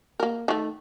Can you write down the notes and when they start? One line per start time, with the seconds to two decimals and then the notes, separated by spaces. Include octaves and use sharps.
0.20 A#3 A#4
0.48 D#3 A3